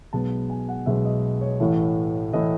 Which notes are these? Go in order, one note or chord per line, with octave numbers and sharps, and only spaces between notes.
B1 B2 G#3 B3 A5
G#5
F#5
B1 B2 G#3 B3 E5
D#5
C#5
A1 A2 E3 A3
A2 E3 A3 D#5